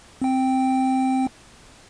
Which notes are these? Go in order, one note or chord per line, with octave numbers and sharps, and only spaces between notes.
C4 G5